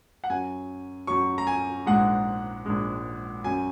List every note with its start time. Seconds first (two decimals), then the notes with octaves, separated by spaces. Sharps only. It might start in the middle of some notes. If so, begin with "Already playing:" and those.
0.24 F#5
0.30 F#2 F#3 G#5
1.07 F#2 F#3 C#6
1.38 A#5
1.47 G#5
1.86 A#1 G#2 G#3 F#5
2.66 A#1 G#2 G#3
3.44 F#2 F#3 G#5